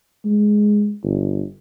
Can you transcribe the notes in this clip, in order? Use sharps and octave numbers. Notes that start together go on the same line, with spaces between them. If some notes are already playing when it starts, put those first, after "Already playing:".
G#3
G1